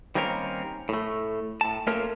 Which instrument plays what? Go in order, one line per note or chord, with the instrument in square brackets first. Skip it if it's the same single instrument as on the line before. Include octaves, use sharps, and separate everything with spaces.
[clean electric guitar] D#3 G3 A#3 C4 C#4 A#4
A2 A3
A2 A5
A3 A#3 C#4 F4 A4 A#4